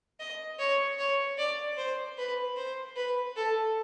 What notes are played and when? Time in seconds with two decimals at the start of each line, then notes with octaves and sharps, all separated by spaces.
0.19 D#5
0.59 C#5
0.99 C#5
1.38 D5
1.77 C5
2.18 B4
2.56 C5
2.96 B4
3.36 A4